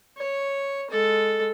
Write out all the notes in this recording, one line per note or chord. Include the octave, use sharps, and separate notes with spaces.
C#5
G#3 A4